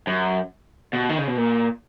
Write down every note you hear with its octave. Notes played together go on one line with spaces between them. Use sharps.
F#2
B2
D#3
C#3
B2
A#2